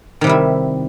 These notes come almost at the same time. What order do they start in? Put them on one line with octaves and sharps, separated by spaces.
D#3 C3 G3 E4